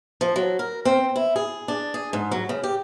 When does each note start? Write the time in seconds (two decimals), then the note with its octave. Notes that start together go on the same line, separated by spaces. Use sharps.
0.21 F3
0.36 F#3
0.59 A#4
0.85 C4
1.16 E4
1.36 G#4
1.68 D4
1.94 G#4
2.13 G#2
2.32 F#3
2.49 C#3
2.64 G4